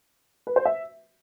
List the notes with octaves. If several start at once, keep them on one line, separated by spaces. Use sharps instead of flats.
B4
C5
E5